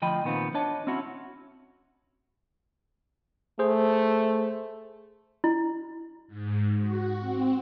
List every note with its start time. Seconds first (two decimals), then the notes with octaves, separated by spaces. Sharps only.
0.02 D2 F3 D#5 G5 B5
0.25 A#2 D#3 B3 C4 F4
0.54 D4 C#5 D#5 A5
0.87 C4 C#4 E4 F#4 C#5
3.59 A3 G#4 C5
5.44 E4
6.28 G#2
6.78 F#4
7.20 C4